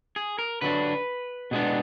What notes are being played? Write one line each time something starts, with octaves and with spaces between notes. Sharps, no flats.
G#4
A#4
D3 F#3 D4 B4
B2 G#3 B3 D4